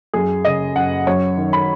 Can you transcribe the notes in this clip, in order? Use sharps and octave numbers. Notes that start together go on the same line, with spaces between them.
F#2 G#4
C#3 D#5
F#1 F#5
F#2 C#5
D#3
B5